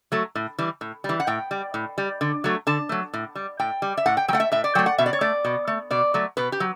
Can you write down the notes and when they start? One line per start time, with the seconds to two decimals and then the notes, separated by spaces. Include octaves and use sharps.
0.12 F#3 A3
0.35 A2
0.59 E3 G3
0.81 A2
1.04 E3 G3
1.20 F#5
1.27 A2 G5
1.51 G3
1.74 A2
1.98 G3
2.21 D3
2.44 F#3 A3
2.67 D3 A5
2.89 F#3 A3
3.14 A2
3.35 G3
3.59 A2 G5
3.82 G3
3.97 E5
4.06 A2 F#5
4.17 G5
4.28 F#3 G5
4.33 A3 F#5
4.40 E5
4.52 A2 E5
4.64 D5
4.75 F#3 A3 G5
4.86 F#5
4.98 B2 E5
5.06 D5
5.13 C#5
5.21 A3 D5
5.45 B2
5.67 A3
5.91 B2 D5
6.14 F#3 A3
6.37 B2 B4
6.52 G4
6.60 F#3